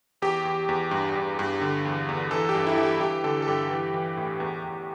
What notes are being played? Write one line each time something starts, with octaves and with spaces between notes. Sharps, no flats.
E2 G4
E2
E2
G2
G2
G2
D3
E2
E2
E3 A4
G4
G2
E4
E3 E4
G4
G2 G4
D3 A4
A4
G2 G4
E3
E3
A2
E2
E2